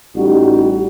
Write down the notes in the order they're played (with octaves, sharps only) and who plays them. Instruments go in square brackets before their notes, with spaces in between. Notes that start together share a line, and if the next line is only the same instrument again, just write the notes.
[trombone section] A1 G3 D#4 F#4